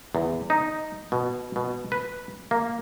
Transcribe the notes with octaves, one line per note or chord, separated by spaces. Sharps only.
E2
D#4
B2
B2
B4
A#3